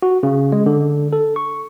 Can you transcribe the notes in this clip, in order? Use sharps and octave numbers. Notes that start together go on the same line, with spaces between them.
F#4
C#3
G#3
D3
A4
C#6